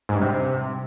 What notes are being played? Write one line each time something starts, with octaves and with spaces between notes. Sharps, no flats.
G#2
G2
C3